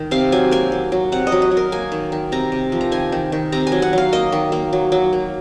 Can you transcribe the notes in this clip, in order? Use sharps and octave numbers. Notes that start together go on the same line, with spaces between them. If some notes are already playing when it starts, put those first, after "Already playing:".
Already playing: D#3
C3 F5
F#3 G#5
A#3 G#5
F#3
F#3
C3 F#5
D#5
F#3
D#5
F#3
A#4
A#3 G#5
D#3
D#3
C3 A#5
C3
F3
A#5
D#3 G#5
D#3
D#3
C3 A#5
G#5
F#3
F#5
F#3 F5
A#3 D#5
D#3
A#3
F#3
F#3
A#3